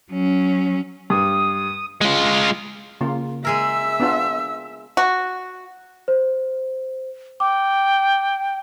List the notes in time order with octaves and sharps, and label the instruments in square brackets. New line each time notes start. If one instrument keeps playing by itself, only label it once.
[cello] F#3 C#4
[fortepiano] G2 [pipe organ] D#6
[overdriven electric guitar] G#3 F4
[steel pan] C#3 A#3 F4
[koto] G#3 G#4 A#4 [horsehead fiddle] E5 [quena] E6
[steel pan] B3 D4 F4
[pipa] F#4
[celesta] C5
[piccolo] G5 [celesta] D6